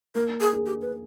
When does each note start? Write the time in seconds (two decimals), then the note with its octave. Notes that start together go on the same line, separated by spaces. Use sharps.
0.15 A#3 A#4
0.41 G#4
0.53 G#4
0.66 G4
0.81 B4